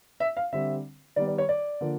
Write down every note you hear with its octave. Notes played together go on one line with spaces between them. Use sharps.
E5
F5
D3 G3 C4 E5
D#3 G3 B3 D5
D5
C#5
D5
D3 F3 A#3